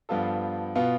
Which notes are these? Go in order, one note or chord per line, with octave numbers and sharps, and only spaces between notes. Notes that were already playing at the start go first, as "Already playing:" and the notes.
G2 F3 B3 F4 A4
B2 B3 F4